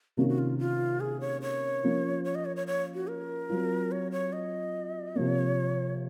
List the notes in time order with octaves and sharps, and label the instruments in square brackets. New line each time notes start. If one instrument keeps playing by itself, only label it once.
[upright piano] C3 D#3 A#3 C#4 [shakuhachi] F#4
[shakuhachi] F#4
F4
F4
G#4
C#5
C#5
[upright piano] F3 A#3 C#4 F4
[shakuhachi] C#5
D#5
C#5
C#5
C#5
F#4
A#4
[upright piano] F#3 C4 F4
[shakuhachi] C#5
C#5
D#5
[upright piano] C3 F3 A#3 [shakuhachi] C#5